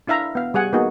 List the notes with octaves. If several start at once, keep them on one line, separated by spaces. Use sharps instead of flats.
D4 E4 E5 F5 A#5
B3 F5
G3 G#4 F#5 G#5
A#3 B3 D#4 F#4 G#4